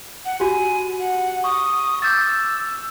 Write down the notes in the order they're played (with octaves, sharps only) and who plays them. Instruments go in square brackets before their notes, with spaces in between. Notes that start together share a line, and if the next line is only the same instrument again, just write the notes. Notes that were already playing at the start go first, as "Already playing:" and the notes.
[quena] F#5
[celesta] F#4 G4 [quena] G#5
[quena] F#5
[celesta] C#6 [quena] D#6
[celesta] D6 G6 A6 [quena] E6